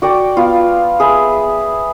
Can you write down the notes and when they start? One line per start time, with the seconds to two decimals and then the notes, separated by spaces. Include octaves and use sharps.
0.02 F#4 D5 G5 D6
0.37 B3 F4 F5
1.00 G#4 B4 E5